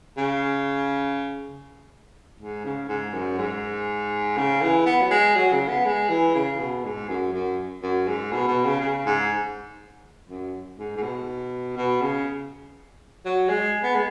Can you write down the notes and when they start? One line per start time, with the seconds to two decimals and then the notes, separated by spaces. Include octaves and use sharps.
0.18 C#3
2.40 G#2
2.65 C#3
2.89 G#2
3.14 F#2
3.38 G#2
4.37 C#3
4.62 E3
4.86 B3
5.01 F#3
5.11 G#3
5.36 F#3
5.52 C#3
5.69 B3
5.85 G#3
6.09 E3
6.35 C#3
6.59 B2
6.84 G#2
7.08 F#2
7.33 F#2
7.83 F#2
8.08 G#2
8.32 B2
8.48 B2
8.65 C#3
8.81 C#3
9.06 G#2
10.29 F#2
10.79 G#2
10.97 G#2
11.03 B2
11.77 B2
12.02 C#3
13.26 F#3
13.49 G#3
13.84 B3
13.95 G#3